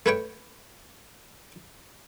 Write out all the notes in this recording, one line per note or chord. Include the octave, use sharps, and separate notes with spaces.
A3 B4 C#5 G5